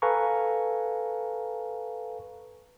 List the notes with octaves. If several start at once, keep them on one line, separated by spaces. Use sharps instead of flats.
A4 B4 F5 G#5 A#5 C#6